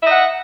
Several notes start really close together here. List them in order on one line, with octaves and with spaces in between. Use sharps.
E5 D#5 F#5